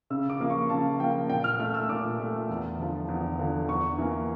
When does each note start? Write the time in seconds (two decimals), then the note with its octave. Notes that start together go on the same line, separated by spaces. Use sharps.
0.10 C#3 E6
0.30 D6
0.40 F3 A#3
0.50 C#6
0.70 C#3 A5
1.00 F3 G5
1.04 A#3
1.29 A#2 G5
1.44 F6
1.59 A3 F6
1.74 E6
1.89 A#2 D6
2.20 A3
2.49 E2
2.79 D3 F3
3.09 E2
3.39 D3 F3
3.68 E2 C#6
3.98 E3 A#3